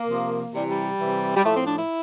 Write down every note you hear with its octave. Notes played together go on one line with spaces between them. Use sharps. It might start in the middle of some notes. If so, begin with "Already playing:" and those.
Already playing: A#3
C3 F3
C3 E3 G3
G3
C3 E3
G3
A2 F3 A3
C4
D4
E4